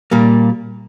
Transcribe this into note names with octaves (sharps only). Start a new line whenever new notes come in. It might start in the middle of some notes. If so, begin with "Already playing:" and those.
A#2 G3 A#3